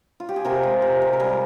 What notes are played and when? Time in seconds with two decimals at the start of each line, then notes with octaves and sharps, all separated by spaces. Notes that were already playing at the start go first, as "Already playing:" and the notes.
0.20 F4
0.29 G4
0.36 G#4
0.45 C3 G4 A#4
0.63 G#3
0.82 C3
1.02 C3
1.13 A#4
1.20 G3 G#4 C5